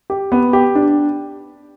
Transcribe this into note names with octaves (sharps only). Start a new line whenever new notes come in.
G4
B3
G4
D4